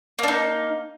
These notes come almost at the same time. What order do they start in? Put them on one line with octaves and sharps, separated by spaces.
A#3 D4 D#4